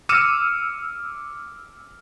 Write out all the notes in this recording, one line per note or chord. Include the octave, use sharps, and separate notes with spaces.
D6 E6 F6 C#7 D#7 E7